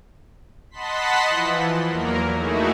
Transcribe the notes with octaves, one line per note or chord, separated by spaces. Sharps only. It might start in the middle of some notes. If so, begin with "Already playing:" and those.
D#5 F#5 A5 B5 C6 B6
E3 F3
E2 F#3 A#3 A#4
A3 D#4 E4 F#4 G#4